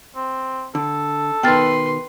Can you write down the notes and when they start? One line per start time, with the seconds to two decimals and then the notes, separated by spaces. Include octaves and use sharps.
0.15 C4
0.75 D3 A4
1.43 B2 D#3 B4 G5 C6 F6 A6